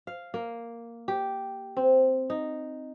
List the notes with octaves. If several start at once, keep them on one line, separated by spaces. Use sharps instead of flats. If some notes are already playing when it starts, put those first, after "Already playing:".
F5
A#3
G4
C4
D#4